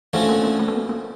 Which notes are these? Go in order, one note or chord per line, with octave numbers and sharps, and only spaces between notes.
D3 E3 F3 A3 C#4 F#4
A#3
A#3
A3
B3
A#3
A#3